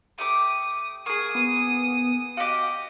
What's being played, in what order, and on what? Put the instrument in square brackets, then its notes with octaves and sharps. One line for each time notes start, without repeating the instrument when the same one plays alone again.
[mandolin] A3 G4 D6 [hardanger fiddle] D#6
[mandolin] A#3 G#4 [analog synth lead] C#6 [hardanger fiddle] D#6
[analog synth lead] B3
[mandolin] F#4 G4 [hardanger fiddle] D#5 [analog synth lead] F5